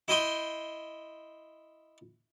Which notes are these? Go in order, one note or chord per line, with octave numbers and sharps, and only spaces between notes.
E4 D#5 G5 C6